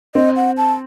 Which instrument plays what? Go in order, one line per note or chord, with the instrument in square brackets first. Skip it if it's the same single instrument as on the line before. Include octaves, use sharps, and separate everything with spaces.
[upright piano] C4 [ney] D#5
[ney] F#5
A5